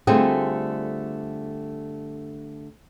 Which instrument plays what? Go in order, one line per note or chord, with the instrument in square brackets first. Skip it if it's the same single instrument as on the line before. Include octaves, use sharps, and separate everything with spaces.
[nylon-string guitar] D3 G3 A3 C4 F4 G#4